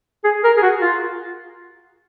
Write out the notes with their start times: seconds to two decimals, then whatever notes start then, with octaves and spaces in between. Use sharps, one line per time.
0.25 G#4
0.44 A#4
0.57 G#4
0.63 F#4
0.82 F4